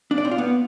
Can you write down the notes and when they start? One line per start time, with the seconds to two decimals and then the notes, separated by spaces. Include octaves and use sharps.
0.11 D4
0.18 D5
0.25 C4
0.31 F4
0.38 B3